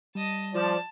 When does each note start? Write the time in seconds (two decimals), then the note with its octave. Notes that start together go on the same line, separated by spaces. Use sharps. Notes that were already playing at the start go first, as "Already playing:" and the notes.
0.15 G3 D#5 A5
0.54 F3 D5 A5